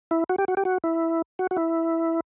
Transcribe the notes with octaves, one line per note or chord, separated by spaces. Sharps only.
E4
F#4
G4
F#4
G4
F#4
E4
F#4
F#4
E4